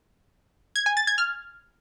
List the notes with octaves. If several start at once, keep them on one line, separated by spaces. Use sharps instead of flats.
G#6
G#5
A6
G#6
F6